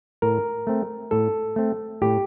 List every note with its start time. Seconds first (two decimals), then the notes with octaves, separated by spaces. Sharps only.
0.22 A2 A#4
0.67 A3 C4
1.11 A2 A4
1.56 A3 C4
2.02 A2 G4